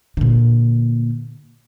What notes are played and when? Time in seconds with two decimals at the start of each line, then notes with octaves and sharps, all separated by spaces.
0.17 A#2 D3